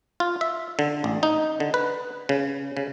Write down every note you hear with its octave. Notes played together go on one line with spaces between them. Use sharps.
F4
E5
D3
A1
D#4
D3
B4
C#3
C#3